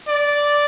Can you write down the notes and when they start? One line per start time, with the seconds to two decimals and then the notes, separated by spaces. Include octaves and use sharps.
0.08 D5